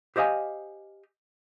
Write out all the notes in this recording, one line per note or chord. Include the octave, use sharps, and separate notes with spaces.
G4 C5 D#5 F5 G#5